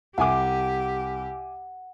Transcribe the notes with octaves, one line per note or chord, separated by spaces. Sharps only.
C2 G4 E5 F#5 G#5 D6